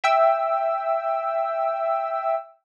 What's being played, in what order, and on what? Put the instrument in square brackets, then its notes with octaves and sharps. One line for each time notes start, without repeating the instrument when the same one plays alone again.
[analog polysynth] E5 G5 E6